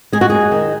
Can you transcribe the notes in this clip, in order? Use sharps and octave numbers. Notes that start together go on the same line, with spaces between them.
G#3 G#4
F#4
F#2 G#4
D#3